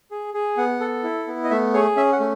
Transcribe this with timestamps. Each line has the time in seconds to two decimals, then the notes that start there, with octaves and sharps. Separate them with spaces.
0.11 G#4
0.34 G#4
0.57 B3 F#5
0.80 A4
1.03 E4
1.27 B3
1.44 D#5
1.50 A3 E5
1.73 G#4 C#5
1.97 C#4 E5
2.12 F#5
2.20 A3